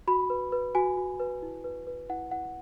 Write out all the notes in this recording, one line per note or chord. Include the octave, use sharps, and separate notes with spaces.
F#4 B5
B4
B4
F#4 G#5
F#4
B4
E4
B4
B4
E4 F#5
E4 F#5